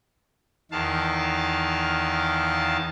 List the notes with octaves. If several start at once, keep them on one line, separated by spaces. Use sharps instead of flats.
E2 D#3 F5 A5